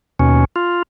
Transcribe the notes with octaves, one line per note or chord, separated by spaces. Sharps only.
D#2 B2 C#4
F4